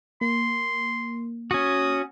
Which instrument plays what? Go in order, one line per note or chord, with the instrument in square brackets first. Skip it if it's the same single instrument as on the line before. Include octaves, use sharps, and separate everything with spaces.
[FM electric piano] A#3 [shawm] C6
[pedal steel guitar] C#4 F#4 [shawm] D#6